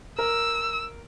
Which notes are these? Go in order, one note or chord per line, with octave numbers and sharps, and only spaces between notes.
A#4 E6